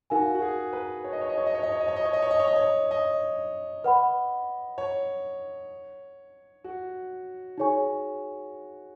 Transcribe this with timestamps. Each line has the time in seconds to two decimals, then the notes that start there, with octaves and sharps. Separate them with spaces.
0.10 D#4 F#4 A#4 F5 G#5
0.35 F#4
0.42 G#4
0.73 B4
1.04 C#5
1.13 D#5
1.21 C#5
1.29 D#5
1.38 C#5
1.46 D#5
1.55 C#5
1.63 D#5
1.72 C#5
1.80 D#5
1.88 C#5
1.96 D#5
2.05 C#5
2.13 D#5
2.22 C#5
2.31 D#5
2.39 C#5
2.47 D#5
2.56 C#5
2.91 D#5
3.84 B4 F#5 B5
4.78 C#5
6.64 F#4
7.58 D#4 G#4 C#5 G#5 C#6